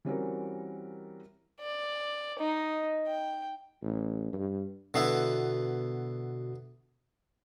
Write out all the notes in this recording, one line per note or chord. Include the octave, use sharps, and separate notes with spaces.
E3 G3 C4 C#4 F#4 A#4
D5
D#4 D#5
G5
A1
G2
B2 D3 B3 E4 F#4 C7